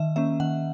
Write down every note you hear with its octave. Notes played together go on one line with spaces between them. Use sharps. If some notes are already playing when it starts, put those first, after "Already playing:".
Already playing: D#3 E5
A#3 C#4 E5
D#3 F#5